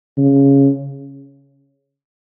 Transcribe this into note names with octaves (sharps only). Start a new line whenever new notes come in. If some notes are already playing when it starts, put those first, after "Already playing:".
C#3